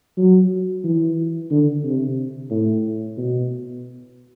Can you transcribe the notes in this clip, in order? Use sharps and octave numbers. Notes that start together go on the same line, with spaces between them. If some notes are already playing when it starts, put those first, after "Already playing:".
F#3
E3
D3
C3
A2
B2